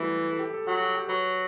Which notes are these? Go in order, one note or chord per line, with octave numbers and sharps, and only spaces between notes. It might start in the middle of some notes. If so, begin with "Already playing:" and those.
Already playing: E3 F#3 G3 A3
A4
G4
A4
F#3 F#4
G4
G4
F#3 B4